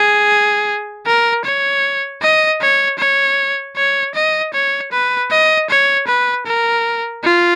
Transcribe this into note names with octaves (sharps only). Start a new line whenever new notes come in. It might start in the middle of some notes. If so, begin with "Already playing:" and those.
Already playing: G#4
A#4
C#5
D#5
C#5
C#5
C#5
D#5
C#5
B4
D#5
C#5
B4
A#4
F4